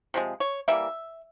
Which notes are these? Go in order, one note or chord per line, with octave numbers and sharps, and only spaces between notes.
C3 F3 G#3
C#5
E3 G3 A#3 E5